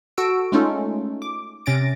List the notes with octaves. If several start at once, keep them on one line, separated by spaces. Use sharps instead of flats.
F#4 A4 E6 D7
G#3 A3 C#4 D#4 F4 A4
D6
C3 C#4 A6 A#6 D7